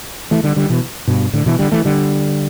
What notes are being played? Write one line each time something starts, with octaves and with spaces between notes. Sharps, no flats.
E3 A3
D3 G3
D3 G3
B2 E3
G2 B2
A2 D3
B2 E3
D3 G3
E3 A3
D3 G3